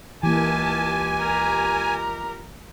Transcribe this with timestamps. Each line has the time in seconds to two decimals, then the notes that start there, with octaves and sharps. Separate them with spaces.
0.23 C#2 E3 A#3 G4 G#5 A5
1.19 A#4